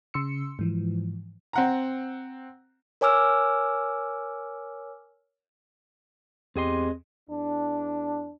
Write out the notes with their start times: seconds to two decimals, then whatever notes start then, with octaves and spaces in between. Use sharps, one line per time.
0.14 C#3 C6 E6 C#7
0.59 G#2 E3 F3
1.53 C4 F#5 A#5
3.01 A#4 C#5 G#5 D6 E6 F6
6.56 E2 C4 G4 G#4 D#5 C6
7.30 E2 D4